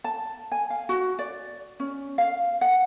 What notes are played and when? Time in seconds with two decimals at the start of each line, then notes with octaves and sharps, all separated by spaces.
0.04 A5
0.52 G#5
0.70 F5
0.89 F#4
1.19 D5
1.80 C#4
2.18 F5
2.61 F#5